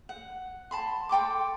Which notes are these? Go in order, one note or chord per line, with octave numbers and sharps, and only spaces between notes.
F#5
A5 B5 C6
A4 G5 C6 D6